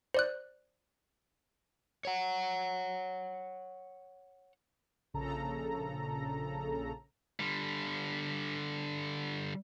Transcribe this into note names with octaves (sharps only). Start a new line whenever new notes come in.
C5 D5 F#6
C#5 F#5
A#1 C#3 A4 A#5
D3 G3